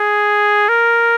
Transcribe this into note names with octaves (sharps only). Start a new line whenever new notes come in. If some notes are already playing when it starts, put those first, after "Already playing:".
Already playing: G#4
A#4